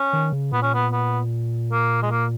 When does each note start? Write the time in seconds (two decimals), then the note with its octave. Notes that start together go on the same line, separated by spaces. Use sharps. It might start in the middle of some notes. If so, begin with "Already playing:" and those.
Already playing: C#4
0.13 D#3
0.32 C#3
0.52 A#2 B3
0.62 C#4
0.74 B3
0.92 B3
1.72 A#3
2.02 G#3
2.11 A#3